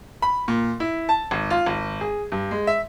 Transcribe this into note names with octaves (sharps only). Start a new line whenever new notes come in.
B5
A#2
E4
A5
G#1
F4
G#1
G#4
G2
G#3
E5